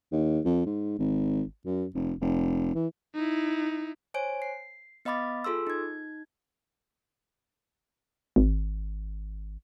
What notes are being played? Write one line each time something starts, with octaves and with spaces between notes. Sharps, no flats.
D#2
F2
G#2
G#1
F#2
F1
F1
E3
D#4 E4
C5 C#5 G#5 D7
C7
B3 D#5 F5 B5 D6 A6
F4 G#4 A4 C6 E6
D#4 G#6
G#1